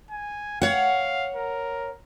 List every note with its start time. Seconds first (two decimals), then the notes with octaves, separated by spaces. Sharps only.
0.11 G#5
0.62 C#5 F5 F#5
1.36 A#4